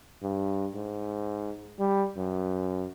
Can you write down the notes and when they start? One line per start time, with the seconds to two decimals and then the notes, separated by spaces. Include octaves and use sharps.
0.23 G2
0.75 G#2
1.79 G3
2.17 F#2